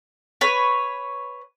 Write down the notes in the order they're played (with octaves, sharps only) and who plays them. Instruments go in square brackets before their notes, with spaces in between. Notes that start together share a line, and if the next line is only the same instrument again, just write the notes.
[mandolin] B4 C#5